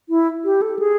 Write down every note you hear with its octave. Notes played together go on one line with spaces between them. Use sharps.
E4
G4
A4
G#4